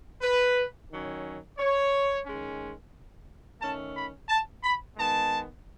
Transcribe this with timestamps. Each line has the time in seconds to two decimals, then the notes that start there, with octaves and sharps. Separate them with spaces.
0.22 B4
0.89 D#3 F#3 C#4
1.58 C#5
2.25 D#3 G#3 C#4
3.61 D#3 A3 C#4 A5
3.96 B5
4.29 A5
4.63 B5
4.97 D#3 G#3 B3 A5